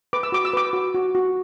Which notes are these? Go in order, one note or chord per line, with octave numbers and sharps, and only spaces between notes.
B4 D6
E6
F#4 D6
E6
B4 D6
F#4
F#4
F#4